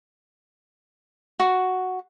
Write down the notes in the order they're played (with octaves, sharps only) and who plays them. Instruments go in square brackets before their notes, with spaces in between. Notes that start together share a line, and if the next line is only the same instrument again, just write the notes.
[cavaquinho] F#4